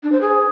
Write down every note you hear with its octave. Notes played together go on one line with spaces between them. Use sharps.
D4
C5
G#4